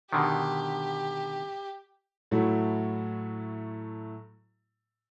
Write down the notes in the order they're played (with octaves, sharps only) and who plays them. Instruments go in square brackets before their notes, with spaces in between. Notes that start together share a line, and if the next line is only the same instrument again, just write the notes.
[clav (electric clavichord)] B2 D3 D#3 [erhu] G4
[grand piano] A2 F#3 A3 E4 F#4